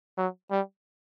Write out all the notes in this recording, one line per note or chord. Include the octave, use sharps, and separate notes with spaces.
F#3
G3